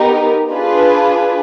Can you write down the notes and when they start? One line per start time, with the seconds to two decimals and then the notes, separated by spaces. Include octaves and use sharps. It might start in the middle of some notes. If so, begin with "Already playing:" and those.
Already playing: B3 D#4 G4 A#4
0.51 D4 F4 G#4 B4